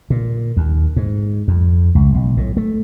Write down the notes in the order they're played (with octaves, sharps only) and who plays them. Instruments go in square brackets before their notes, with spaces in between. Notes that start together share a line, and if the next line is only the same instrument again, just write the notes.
[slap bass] A#2
D#2
G#2
F2
C#2
B1
A2
A3